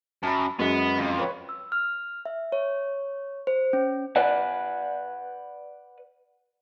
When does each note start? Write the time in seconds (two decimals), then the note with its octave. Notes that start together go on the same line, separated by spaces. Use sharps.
0.23 F#2 A5 B5
0.59 F#2 G#3 B3
0.98 F2
1.19 B4 C#5
1.49 E6
1.72 F6
2.25 E5
2.52 C#5
3.47 C5
3.73 C#4
4.16 B4 D5 F#5